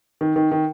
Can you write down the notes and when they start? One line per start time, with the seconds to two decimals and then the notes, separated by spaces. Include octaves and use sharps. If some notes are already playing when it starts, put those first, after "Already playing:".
0.21 D#3
0.36 D#3
0.52 D#3